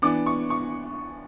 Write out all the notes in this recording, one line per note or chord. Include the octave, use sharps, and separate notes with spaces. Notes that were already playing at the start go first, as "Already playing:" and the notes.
E3 B3 D4 D6
C#6
C#6